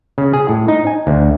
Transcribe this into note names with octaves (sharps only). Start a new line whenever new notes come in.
C#3
G#4
A2
D#4
G#5
D2